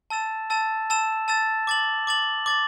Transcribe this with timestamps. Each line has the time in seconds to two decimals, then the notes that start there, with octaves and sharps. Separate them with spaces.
0.10 A5 E6 A6 E7
0.50 A5 E6 A6 E7
0.90 A5 E6 A6 E7
1.28 A5 E6 A6 E7
1.67 D6 A6 F#7
2.07 D6 A6 F#7
2.46 D6 A6 F#7